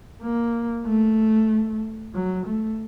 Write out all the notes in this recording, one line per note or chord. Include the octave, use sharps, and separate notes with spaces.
A#3
A3
F#3
A3